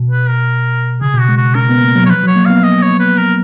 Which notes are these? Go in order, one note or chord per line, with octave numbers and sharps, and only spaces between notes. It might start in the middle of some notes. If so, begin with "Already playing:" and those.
Already playing: B2
B4
A#4
C#3 G#4
B2
F#4
G#3
F#4
C#4 A#4
B3
A#3
F#3
C#5
F3 B4
F#3
C#5
A#3
B3 F5
D#5
C#5
B4
A#4